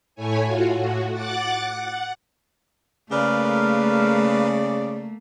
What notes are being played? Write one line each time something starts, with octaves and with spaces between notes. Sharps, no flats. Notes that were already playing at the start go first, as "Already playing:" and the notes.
A2 A3 E4 C#5 G#5
F4 F#4
A2 F#4
F#5 D6 F#6 A6
F#5
C#3 A3 A#3 A#4 B4 D5 F5